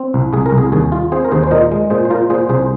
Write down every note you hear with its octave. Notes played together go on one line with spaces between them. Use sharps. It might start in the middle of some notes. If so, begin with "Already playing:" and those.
Already playing: C4
C2
C2 G#4
A#4
C2
G#4
D#2 G#4
F4
C4 G#4 C5
A#4
D#2 G#4 C5
C5
A#2 A#4 D#5
G#3
A#2 G#4 C5
C5
A#2 F4 A#4
A#2 G#4 C5
C2 G#4 C5